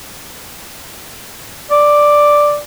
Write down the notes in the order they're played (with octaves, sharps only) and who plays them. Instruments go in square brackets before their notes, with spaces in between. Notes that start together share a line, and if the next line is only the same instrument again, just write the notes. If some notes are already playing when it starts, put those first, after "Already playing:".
[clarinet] D5